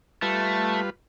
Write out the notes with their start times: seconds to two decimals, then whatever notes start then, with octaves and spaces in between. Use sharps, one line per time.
0.22 G3 A3 F4 B4